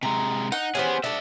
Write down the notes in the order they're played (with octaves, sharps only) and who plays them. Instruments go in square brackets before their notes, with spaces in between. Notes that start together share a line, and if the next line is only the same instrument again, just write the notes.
[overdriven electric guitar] C3 G#3 [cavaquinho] A#5
[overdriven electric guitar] D#4 [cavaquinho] F#5
[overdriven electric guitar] B3 G#4 [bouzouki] C#4 G4 C5
[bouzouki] D4 A4 [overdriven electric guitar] D5 E5